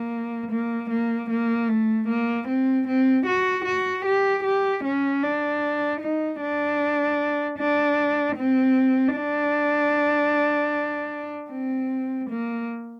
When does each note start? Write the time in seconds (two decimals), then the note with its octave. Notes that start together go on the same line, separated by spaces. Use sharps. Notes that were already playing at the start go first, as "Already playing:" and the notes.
Already playing: A#3
0.51 A#3
0.90 A#3
1.30 A#3
1.69 A3
2.08 A#3
2.48 C4
2.88 C4
3.26 F#4
3.65 F#4
4.06 G4
4.44 G4
4.84 C#4
5.23 D4
6.01 D#4
6.41 D4
7.59 D4
8.37 C4
9.16 D4
11.51 C4
12.30 A#3